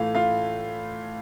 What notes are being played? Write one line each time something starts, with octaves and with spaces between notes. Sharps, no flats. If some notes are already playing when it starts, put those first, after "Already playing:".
Already playing: A2 E3 A3 F4 F5
F4 F5